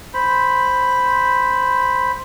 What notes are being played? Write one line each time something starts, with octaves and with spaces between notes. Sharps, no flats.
C5 B5